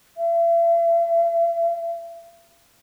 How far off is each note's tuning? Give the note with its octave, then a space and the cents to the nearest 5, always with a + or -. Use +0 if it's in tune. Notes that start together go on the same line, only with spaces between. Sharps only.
E5 +40